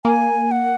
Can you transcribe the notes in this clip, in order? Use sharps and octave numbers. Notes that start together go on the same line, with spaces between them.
A#3 G#5
F#5